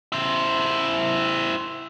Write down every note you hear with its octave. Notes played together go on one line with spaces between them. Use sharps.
E4 C5